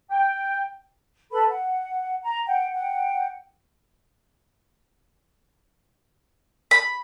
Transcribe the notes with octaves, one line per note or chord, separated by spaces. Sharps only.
G5
A4 B4 B5
F#5
A#5
F#5 G5
F#5 G5
B5